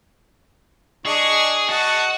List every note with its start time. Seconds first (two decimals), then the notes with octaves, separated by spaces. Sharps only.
1.06 D4 G#4 D#5 C#6
1.69 F#4 D#5 F#5 A5